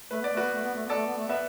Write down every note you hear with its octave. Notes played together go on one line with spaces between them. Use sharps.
A3 B4
B3 D5
A3 F#4 B4
B3
A3
B3
A3
B3 A4 D5
A3
B3
A3
B3 B4 E5